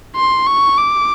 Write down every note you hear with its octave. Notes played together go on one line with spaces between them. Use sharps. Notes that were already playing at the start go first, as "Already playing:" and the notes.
C6
C#6
D6